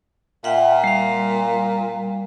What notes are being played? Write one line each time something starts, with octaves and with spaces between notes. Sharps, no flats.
A#2 E5 F#5 G5
G3 F5